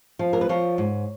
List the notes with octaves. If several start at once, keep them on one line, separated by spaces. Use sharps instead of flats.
F3
A#4
B4
F3 C#5
G#2